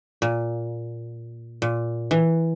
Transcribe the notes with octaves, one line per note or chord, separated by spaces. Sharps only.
A#2
A#2
E3